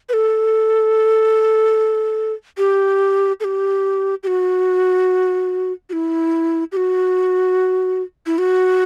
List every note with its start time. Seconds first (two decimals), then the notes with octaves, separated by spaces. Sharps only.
0.09 B4
0.13 A4
2.58 G4
3.40 A4
3.44 G4
4.23 G4
4.27 F#4
5.89 F#4
5.93 E4
6.72 G4
6.77 F#4
8.26 E4
8.38 F#4